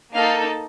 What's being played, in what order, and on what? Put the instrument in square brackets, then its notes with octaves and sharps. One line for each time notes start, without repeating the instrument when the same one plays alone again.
[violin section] A#3 D#4 A4 F5